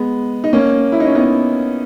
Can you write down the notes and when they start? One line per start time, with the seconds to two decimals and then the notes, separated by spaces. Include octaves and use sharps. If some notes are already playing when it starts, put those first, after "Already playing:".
Already playing: G#3 B3
0.44 D#4
0.53 A#3 C#4
0.92 E4
1.00 D#4
1.07 C#4
1.15 B3 D#4